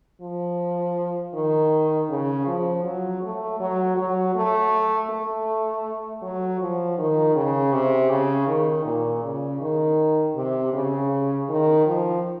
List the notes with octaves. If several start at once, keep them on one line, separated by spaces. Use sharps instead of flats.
F3
D#3
C#3
F3
F#3
A3
F#3
F#3
A3
A3
F#3
F3
D#3
C#3
C3
C#3
D#3
A#2
C#3
D#3
C3
C#3
D#3
F3